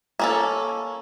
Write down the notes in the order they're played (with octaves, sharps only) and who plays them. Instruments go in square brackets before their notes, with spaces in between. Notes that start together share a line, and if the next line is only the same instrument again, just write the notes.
[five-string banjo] A#3 C#4 A4